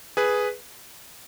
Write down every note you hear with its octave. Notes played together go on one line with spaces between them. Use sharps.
G#4 B4